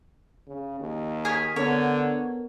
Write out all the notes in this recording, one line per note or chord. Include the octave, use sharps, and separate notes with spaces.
C#3
D#2
G#4 C#5 F6 G#6 B6
D3 B3 A#4 C#5